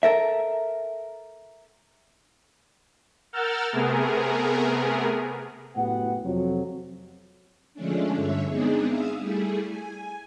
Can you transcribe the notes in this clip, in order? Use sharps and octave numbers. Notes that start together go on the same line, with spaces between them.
A4 A#4 E5
A#4 F#5 E6 F6 G6 A6
C3 A3 B3 G#4 A#4
F#1 A2 B3 F#4 G4 F#5
F2 C3 F#3
D3 F3 G#3 A3 C#4 D4
G2 D3 C#5 E5
G#3 B3 C4 D4 D#4 G#4
E5 F5 D#6 E6
G3 A3 E4 G#4
G#5